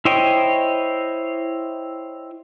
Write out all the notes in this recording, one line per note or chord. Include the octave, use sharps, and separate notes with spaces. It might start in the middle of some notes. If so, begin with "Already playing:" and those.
E4 C5 C#5 D#5 G5